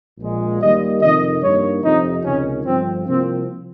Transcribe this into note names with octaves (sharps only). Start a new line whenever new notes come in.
A#1 A#2 G#3
D#2 D#3 G3 A#3 D#5
F2 C3 D#3 D#5
G2 D#3 A#3 C#5
F2 C3 F3 D#4
C#2 C3 D#3 G#3 C#4
G1 G2 F3 C4
C2 C3 F3 A#3 C4